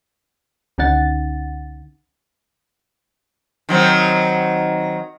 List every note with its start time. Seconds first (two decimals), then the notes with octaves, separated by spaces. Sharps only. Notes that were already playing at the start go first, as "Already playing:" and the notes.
0.78 C#2 D3 C#4 D#4 F#5 A6
3.69 D#3 F#3 C4